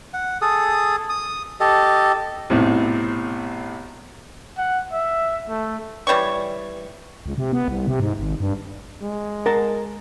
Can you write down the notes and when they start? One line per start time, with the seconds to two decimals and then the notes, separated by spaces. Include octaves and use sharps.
0.14 F#5
0.42 G#4 A4 D#6
1.09 D#6
1.60 G4 A4 D#5
2.50 B1 A2 C3
4.58 F#5
4.92 E5
5.49 A3
6.07 E3 G3 C#5 C#6
7.26 C#2
7.38 C3
7.53 B3
7.68 C2
7.87 C3
8.00 G#2
8.19 G#1
8.40 G2
9.02 G#3
9.46 A#4 F#5 A5